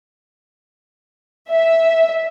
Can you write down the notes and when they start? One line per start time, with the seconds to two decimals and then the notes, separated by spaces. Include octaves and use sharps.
1.50 E5